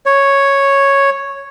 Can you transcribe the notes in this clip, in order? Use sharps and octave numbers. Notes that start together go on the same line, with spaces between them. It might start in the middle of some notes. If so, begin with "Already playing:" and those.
C#5